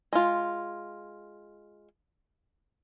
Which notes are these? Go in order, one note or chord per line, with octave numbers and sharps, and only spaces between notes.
G#3 F4